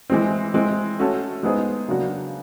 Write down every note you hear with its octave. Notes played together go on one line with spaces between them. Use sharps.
E3 G#3 C4
E3 G#3 C4
A3 C#4 F#4 A4
G#3 B3 D#4 G#4 C5
C#3 F#3 A#3 D4 F#4